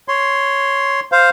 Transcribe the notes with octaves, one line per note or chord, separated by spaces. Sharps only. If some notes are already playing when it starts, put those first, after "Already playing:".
C#5 C6
C5 F5